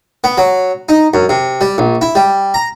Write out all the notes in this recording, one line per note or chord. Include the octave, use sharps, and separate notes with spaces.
B3
F#3
D#4
F#2
C3
G3
A#1
E4
G3
A#5